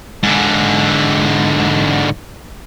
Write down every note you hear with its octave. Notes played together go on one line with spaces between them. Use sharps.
G#2 D3